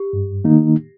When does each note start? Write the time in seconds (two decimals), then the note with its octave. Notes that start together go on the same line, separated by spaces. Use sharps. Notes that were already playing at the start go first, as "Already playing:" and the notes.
Already playing: G4
0.13 G2
0.44 D#3 A#3 D#4